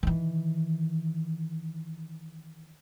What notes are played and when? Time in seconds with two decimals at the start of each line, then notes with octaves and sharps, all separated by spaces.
0.03 D#3 E3